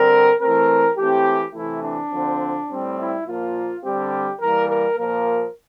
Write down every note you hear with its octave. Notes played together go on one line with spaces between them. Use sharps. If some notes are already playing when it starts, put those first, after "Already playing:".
Already playing: D3 G3 C4 A#4
E3 A3 C4 A#4
E3 A3 C4 G4
C3 E3 A3 E4
D4
D3 F3 C4
A2 G3 C4
E4
A#2 F3 A#3 F4
D3 G3 C4 G4
E3 G3 A#3 A#4
A#4
A#2 F3 A#3 A#4